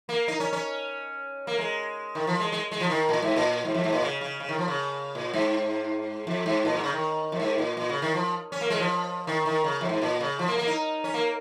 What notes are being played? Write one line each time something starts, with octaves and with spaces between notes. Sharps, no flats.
A#3
D#4
C#4
C#4
A#3
G#3
D#3
F3
G#3
G#3
G#3
F3
D#3
A#2
G#2
A#2
G#2
F2
G#2
A#2
C#3
C#3
C#3
D#3
F3
C#3
A#2
G#2
F2
G#2
A#2
G#2
C#3
D#3
F2
G#2
A#2
A#2
C#3
D#3
F3
C#4
A#3
G#3
F3
D#3
D#3
C#3
F2
G#2
A#2
C#3
F3
A#3
A#3
D#4
C#4
A#3